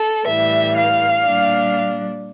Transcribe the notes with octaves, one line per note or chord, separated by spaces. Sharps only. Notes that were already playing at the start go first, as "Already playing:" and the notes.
Already playing: A4
A2 E3 G3 E5
F5
A#2 G3 D4